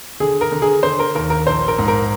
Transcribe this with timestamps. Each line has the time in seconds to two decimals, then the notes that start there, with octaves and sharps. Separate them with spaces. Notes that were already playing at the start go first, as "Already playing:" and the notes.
0.20 D3 G#4
0.41 A#4
0.52 D3
0.62 G#4
0.83 D3 C5
0.99 A#4
1.15 D#2 A#4
1.30 A#4
1.47 A#1 C5
1.68 A#4
1.78 G#2
1.88 A#4